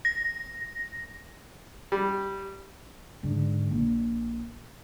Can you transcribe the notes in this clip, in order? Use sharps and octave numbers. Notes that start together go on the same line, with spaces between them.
A#6
G3
G#2 D3
A#1